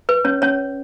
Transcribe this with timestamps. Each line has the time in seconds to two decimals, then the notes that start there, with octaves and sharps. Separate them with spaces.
0.09 B4
0.25 C#4 C#5
0.42 C#4 C#5